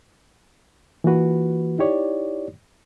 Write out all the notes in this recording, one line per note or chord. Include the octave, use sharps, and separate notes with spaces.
E3 A#3 F4 F#4 B4
D#4 E4 G4 C#5 D5